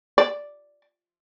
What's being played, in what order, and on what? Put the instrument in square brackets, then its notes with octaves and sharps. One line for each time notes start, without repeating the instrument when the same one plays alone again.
[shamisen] D5